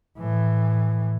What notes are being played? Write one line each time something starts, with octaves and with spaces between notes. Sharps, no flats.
A2 E3